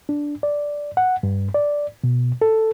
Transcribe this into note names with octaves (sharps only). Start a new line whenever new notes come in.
D4
D5
F#5
G2
D5
B2
A4